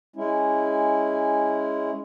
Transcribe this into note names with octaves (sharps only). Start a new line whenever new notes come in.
G#3 C#4 E4